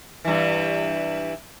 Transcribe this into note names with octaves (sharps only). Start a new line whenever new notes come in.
G2 E3